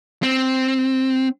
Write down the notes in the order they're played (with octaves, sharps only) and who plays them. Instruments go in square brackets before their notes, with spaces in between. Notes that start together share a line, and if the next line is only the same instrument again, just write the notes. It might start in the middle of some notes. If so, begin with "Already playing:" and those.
[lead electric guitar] C4